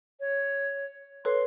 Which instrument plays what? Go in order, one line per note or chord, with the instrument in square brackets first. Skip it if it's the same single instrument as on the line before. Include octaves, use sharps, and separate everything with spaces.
[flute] C#5
[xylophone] A4 B4 C#5 [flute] C6